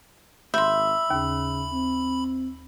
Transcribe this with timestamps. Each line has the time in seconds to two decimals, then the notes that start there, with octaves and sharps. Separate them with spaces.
0.54 G#1 E5 B5 C6 G6
1.10 D#2 C#3
1.73 C4